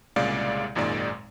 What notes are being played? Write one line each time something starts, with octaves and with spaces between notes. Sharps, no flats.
C2 A#2 C#3 G#3 D5 F5
G#1 F#2 A#2 D#3 G#3 D5